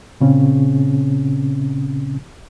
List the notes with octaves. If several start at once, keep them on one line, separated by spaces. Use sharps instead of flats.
A#2 C#3 C4 C#4